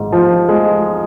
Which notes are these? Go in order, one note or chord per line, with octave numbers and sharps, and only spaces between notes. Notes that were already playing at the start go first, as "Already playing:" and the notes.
Already playing: G#1 G#2
F3
G#3